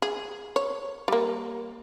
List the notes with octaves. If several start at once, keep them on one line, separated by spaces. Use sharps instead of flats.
G#4
C#5
G3 A#3